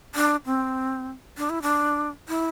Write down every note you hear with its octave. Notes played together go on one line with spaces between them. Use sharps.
D4
C4
D4
E4
D4
E4